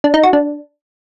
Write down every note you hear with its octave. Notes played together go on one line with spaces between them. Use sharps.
D4
D#4
F#4
D4